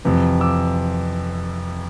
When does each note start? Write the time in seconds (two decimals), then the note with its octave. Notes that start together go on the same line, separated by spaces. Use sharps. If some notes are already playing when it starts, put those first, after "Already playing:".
0.05 F2 C3 E3
0.41 D6 E6